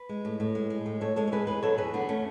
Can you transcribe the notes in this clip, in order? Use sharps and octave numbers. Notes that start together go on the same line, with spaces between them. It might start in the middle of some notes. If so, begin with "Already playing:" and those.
Already playing: B4
G#3
A2
A2
G#3
G#3
A2
A2 A4 C#5
G#3 A4 C#5
C#5
G#3 G#4 B4
E2 G#4 B4
F#3 A4 C#5
E2 G#4 B4
D3 B3 D4
A3 C#4